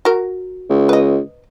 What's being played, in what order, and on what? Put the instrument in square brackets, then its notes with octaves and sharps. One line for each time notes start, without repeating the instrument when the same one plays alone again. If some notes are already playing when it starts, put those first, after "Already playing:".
[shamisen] F#4 A#4
[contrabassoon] C#2
[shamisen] B4 D#5